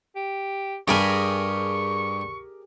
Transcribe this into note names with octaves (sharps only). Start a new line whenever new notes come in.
G4
G2 G3 G4 G#4 A#4 G#5 C#6